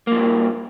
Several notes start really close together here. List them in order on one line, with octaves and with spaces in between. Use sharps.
A#3 F3 G2